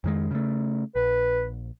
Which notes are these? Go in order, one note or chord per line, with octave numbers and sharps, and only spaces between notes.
F2 D#3 G#3
C#3 A3
A#1 B4